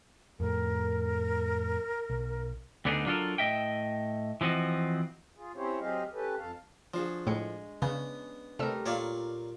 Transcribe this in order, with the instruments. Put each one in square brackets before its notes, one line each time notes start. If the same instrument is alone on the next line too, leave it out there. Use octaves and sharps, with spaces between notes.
[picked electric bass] F2 A2 [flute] A#4
[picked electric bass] B1
[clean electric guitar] D2 D3 B3 D4 D#4 G#4
F#3 D4 F4 F#4 A4 A#4
A2 D#5 E5 G5
E3 F3 C4 F#4 D#5
[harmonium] F4 G#4
C4 C#4 E4 G4 C5 C#5
F#3 C4 G4 G#4 D#5 F5
C#4 G4 A4 B4
F2 A4 F5
[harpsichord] F3 [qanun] D4 F#4 G#4
[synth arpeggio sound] A2 C#7 [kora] G#3
[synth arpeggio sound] C#3 [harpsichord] B3 [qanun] C#4 D4
[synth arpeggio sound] C3 E6 [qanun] G3 [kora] A3 A#4
[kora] A#2 [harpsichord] C#5 D5 F5